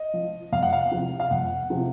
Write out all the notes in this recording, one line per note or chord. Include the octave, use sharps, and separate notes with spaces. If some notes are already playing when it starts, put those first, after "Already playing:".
Already playing: D#5
F3
F2 F5
F#5
F5
C3 F3
F5
F2 F#5
C3 F3